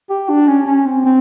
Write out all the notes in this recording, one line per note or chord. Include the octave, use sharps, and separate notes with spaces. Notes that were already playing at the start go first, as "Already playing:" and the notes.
G4
D4
C#4
C#4
C4
C4